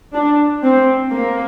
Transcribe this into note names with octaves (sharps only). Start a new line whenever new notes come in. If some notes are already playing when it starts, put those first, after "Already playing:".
D4
C4
A#3